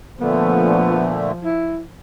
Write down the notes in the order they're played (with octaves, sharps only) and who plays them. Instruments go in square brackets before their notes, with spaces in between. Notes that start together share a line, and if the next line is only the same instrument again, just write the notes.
[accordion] A#2 D3 A3 [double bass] F3 [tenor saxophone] B3
[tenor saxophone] E4